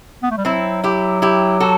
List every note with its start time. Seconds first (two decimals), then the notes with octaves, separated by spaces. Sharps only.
0.23 B3
0.31 A3
0.37 G3
0.45 F#3 C4 E4
0.84 E4 G4
1.22 E4 G4
1.60 F#4 A4